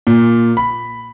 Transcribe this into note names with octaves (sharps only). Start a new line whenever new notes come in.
A#2
B5